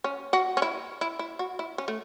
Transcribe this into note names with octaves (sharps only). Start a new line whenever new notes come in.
C#4
F#4
C#4
E4
E4
E4
F#4
E4
C#4
A3